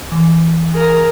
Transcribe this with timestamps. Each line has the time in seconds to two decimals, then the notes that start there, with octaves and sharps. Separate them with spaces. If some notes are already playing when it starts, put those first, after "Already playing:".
0.12 E3
0.72 G#4 A#4